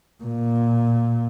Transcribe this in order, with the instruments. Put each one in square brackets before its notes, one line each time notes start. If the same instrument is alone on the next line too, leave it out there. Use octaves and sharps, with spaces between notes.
[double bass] A#2